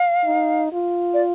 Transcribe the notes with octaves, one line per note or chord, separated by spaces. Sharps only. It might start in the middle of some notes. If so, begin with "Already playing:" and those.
Already playing: F5
D#4
F4
D5